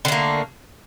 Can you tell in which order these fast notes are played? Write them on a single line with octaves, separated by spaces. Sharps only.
D3 A3 A#3